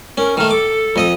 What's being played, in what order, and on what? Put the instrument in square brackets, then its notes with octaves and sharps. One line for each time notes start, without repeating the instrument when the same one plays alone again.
[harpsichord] C#4 [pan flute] A#4
[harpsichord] D#3 A3 [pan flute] F6
[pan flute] A4 [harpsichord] D6
[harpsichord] F2 D#5 D#6